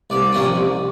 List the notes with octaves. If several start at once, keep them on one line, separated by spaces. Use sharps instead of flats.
C2 D5
C3 F3 A#3 C#4
C2